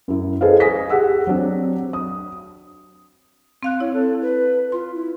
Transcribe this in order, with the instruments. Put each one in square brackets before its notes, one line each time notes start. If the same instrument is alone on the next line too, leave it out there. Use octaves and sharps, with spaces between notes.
[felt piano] F#2 E4
G#4 A4 B4 C5 D#5 F5
G#5 D#6 A#6 B6
G4 G#4 F#5 E6
F#3 C4 D4
D#6
[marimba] C4 F5 F#6
[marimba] E4 [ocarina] C#5
[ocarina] A4
B4
[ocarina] F4 [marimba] C6
[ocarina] E4